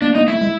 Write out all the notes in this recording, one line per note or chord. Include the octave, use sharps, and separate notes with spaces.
A#3 D4
A#3 D#4
A3 E4
G#3